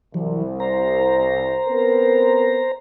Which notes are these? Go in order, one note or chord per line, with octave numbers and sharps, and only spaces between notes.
C2 E3 F#3
C5 A#5
B3 C4 A#4